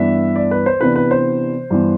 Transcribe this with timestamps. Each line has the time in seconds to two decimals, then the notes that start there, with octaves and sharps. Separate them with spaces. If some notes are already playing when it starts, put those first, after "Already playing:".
Already playing: G2 E3 B3 D4 E5
0.36 D5
0.51 B4
0.66 C5
0.81 C3 E3 B3 D4 B4
0.96 B4
1.11 C5
1.71 G2 E3 B3